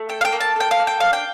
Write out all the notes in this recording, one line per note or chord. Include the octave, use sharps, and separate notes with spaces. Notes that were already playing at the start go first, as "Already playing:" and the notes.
Already playing: A3
A4 G5
F5
G5
A#3
A5
A4 G5
F5
A#3
G5
D4 F5
G5